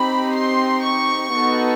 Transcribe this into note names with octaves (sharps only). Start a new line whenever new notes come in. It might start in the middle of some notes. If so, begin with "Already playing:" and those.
Already playing: C4 D#4 G4 B5
C6
C#6
B3 D#4 F#4 A4